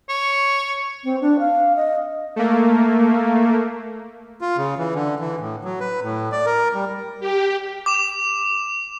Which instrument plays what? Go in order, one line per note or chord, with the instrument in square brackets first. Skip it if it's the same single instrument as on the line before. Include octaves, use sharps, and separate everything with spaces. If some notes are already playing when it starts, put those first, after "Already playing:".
[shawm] C#5
[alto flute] C4
D4
F5
D#5
[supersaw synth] A3 A#3
[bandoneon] F4
C#3
E3
D3
E3
A2
F#3
B4
A2
D5
A#4
G3
[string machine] G4
[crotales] D6 E7